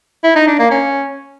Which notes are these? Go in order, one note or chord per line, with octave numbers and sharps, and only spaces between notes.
E4
D#4
D4
A#3
C#4